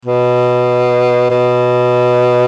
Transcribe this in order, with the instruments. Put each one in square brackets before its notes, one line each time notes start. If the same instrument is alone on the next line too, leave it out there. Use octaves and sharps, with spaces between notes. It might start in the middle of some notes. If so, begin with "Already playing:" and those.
[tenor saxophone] B2
B2